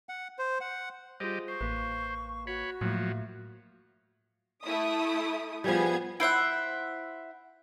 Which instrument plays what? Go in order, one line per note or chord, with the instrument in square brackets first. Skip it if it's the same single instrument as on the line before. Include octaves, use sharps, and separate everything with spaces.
[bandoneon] F#5
C5
F#5
[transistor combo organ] G3 G4 D#5 [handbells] F4 G#4 C5
[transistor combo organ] C5 [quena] C#6
[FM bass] A1 [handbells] A#3 B4
[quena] F#4 [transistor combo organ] C#5 B5
[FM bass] A2 [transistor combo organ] F3 F#3 [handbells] A3 A#3
[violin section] A3 E4 D#6
[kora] F3 G3 [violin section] B3 G#4 G#6
[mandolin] E4 C5 E5 F#5